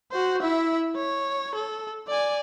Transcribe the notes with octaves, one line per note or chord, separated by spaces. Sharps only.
F#4 C5
E4 E5
C#5
A4
D5 G#5